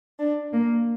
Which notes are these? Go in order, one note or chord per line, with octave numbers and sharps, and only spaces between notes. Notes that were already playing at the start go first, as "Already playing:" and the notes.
D4
A#3